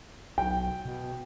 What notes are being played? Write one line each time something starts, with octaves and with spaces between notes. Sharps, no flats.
B1 G5
B2